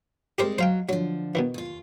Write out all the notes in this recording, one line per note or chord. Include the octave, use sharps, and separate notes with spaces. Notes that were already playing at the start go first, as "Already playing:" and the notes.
G3 G#3 C4 G4 A#4 C5
F#3 C5 F5 G5
D3 F3 F#3
B2 D#3 E3
D#2 F4